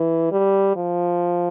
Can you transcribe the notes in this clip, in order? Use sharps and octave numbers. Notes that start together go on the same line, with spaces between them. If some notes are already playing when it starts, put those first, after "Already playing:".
Already playing: E3
G3
F3